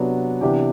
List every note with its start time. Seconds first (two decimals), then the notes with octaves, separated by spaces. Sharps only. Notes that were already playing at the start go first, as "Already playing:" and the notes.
Already playing: C3 F#3 B3 D4
0.41 C3 E3 B3 D4 G4